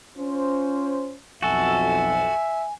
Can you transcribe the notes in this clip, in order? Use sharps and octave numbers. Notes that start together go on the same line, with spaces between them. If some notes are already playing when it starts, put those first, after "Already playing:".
C#4 F4 C5
B1 F2 F#4 A4 E5 G#5